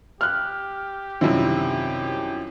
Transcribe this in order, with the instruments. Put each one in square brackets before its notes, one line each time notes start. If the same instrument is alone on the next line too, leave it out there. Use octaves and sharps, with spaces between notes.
[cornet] G4 [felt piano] F6 F#6
[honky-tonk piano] F#2 E4 [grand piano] C3 G3 C4 [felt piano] D#3 F4